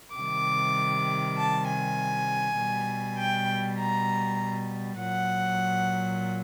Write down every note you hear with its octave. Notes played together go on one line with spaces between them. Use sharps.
C3 D#3 G3 D6
A5
G#5
B2 G3
G5
A#5
A#2 F#3 F#5